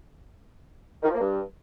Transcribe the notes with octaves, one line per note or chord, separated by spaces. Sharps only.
D#3
F3
A#3
G2